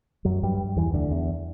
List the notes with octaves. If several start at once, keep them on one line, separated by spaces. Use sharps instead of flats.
F#2 F#3
G2 G3
E2 E3
D2 D3
E2